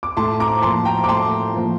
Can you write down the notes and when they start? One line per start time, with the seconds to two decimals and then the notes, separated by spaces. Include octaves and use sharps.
0.03 D6
0.17 A2 A5 C6
0.40 A#5 D6
0.62 F3 A#3 A5 C6
0.85 G5 A#5
1.04 D6
1.08 A2 A5 C6
1.54 F3 A#3